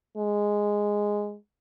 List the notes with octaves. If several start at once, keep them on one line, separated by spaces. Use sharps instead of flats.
G#3